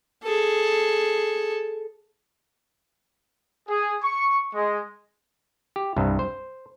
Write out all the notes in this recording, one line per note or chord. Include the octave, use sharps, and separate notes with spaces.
G#4 A4
G#4
C#6
G#3
G4
C2 G2
C5